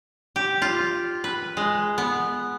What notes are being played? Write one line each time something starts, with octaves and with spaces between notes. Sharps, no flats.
G4
F4
B4
G#3
B3